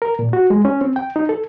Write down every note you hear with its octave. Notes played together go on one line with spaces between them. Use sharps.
A#4
A#2
F#4
G#3
C#4
C4
G5
D#4
A4